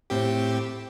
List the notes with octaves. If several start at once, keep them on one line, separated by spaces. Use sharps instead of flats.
A2 C4 G4